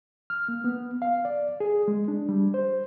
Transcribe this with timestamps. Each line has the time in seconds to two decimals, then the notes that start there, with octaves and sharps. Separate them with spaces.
0.30 F6
0.48 A#3
0.64 B3
1.02 F5
1.25 D5
1.60 G#4
1.88 G#3
2.08 D4
2.29 G3
2.54 C5